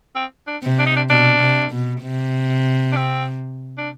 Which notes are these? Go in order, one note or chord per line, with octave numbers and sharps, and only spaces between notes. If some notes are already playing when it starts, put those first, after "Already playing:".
C4
D4
C3
D4
D#4
D4
B2 D4
C3
B2
C3
D4
C4
D4